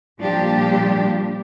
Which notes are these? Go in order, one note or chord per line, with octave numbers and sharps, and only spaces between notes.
A#2 F3 G3 D4 G4